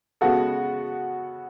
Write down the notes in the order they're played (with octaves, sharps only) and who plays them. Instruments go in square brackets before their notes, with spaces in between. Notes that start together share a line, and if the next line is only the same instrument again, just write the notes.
[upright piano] C#3 G#3 B3 F#4 A4